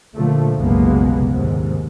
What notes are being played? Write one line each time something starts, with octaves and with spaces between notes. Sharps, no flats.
A#2 D3 F3 A3
F#1 C2 B2 G#3 A#3 B3
D#2 G#2 C3